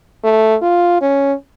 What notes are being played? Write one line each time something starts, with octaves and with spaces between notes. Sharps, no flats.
A3
F4
C#4